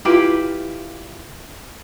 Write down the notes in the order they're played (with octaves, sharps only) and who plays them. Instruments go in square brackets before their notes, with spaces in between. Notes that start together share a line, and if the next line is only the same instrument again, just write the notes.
[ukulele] E4 F4 G4 B4